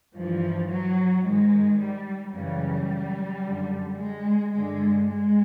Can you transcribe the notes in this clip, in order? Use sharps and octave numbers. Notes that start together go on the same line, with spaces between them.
G2 E3 F3
F#3
G#2 D#3 G#3
G3
F#2 C#3 E3 G3
F#2 D3
G#3
G2 D3 G#3
G#3